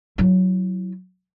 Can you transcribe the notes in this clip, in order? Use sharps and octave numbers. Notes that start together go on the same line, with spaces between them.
F#3 E4